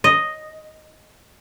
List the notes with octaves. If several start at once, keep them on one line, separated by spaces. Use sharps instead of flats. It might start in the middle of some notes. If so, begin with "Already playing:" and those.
D#5